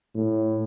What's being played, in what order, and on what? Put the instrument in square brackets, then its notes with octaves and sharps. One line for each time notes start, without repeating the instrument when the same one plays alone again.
[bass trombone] A2